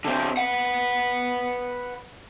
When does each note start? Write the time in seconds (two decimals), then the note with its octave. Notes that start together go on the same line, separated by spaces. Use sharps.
0.05 D3 C4
0.37 B4 F#5